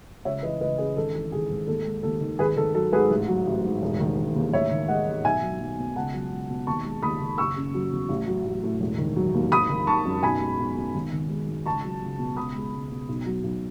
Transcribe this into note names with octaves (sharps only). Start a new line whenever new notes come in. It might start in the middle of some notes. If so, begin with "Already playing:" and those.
C#2 C#5 E5
E3 B4 D#5
C#2 B4 D#5
C#3 G#4 B4
G#1 A4
E3
G#1 G#4
G#2
D#2 A4
G#3
D#2 A4
D#3
G#1 G#4 B4
D#3 A4
F#3 A4
G#2 G#4 B4
A1
F#3
A1
G#2
E1
D#3
E1
D#2
A1 C#5 E5
D#3
G#3 D#5 F#5
G#2
B1 E5 G#5
F#3
B1
B2
C#2 F#5 A5
F#3
C#2
B2
D#2 A5 C#6
G#3
D#2 B5 D#6
D#3
F#1 C#6 E6
C#3
F#3
E2
A1
F#3
A1
A2
E1
D#3
F#3
D#2
G#1 B5 D#6
D#3
G#1 A5 C#6
F#2
B1 G#5 B5
G#3
B1
B2
G#1
D#3
G#3
G#2
C#2 A5 C#6
F#3
C#2
B2
C#2 B5 D#6
G#3
C#2
B2
B1
F#3
B1